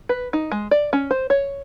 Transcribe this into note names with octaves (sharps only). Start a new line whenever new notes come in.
B4
D#4
G#3
D5
C#4
C5
C#5